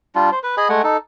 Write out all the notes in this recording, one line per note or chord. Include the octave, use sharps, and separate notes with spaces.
G3 D4 F4
C5
B4
G#4 D#5 G#5 B5
G#3 A3 F#5 G#5
D#4 A4